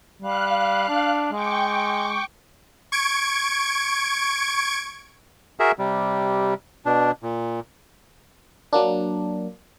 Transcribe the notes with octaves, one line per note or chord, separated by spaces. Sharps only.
G3 F5 F#6
D4
G#3 G5 C#6 D6
C#6 G#6 D7
F#4 G#4 A#4 E5
C3 G3
B2 D4
A#2
F#3 A#3 D4